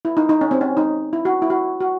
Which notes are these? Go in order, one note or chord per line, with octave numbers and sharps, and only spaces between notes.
E4
D#4
D#4
C#4
C4
C#4
D#4
E4
F#4
E4
F#4
F#4